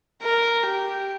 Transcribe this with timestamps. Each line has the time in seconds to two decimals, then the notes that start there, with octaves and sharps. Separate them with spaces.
0.22 A#4
0.65 G4